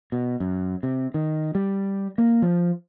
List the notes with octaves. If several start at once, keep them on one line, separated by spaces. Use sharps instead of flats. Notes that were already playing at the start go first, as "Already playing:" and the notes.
B2
F#2
C3
D#3
G3
A#3
F3